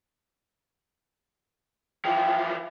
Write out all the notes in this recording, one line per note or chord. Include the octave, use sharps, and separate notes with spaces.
E3 F3 G5